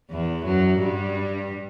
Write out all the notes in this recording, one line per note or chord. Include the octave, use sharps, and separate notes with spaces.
E2 E3
F#2 F#3
G2 G3